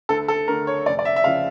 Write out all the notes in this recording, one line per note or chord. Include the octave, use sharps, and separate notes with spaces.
D2 A4
A4
D3 A3 A#4
C#5
F1 D5
D5
E5
E5
C#3 F3 F5